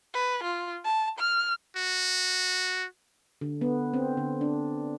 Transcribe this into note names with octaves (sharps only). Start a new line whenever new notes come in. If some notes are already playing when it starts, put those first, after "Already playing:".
B4
F4
A5
F6
F#4
D3
B3
C4
D3
D4